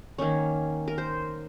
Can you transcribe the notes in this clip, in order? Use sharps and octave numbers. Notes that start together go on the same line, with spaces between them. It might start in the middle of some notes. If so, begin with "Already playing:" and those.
D#3 A#3 C#4 C#5
A#4
C5